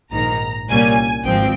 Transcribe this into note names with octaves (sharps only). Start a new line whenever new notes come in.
A#1 G#2 D#3 A#5
C2 A#2 G3 A#3 C#4 G#5
G#1 G2 F3 C4 G5